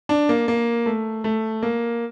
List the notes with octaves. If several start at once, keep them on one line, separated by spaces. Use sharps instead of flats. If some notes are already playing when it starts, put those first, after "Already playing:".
D4
A#3
A#3
A3
A3
A#3